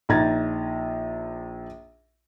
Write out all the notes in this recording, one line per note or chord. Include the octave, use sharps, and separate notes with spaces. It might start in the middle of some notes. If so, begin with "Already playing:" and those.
A#1 D#4 A#5 G#6 A6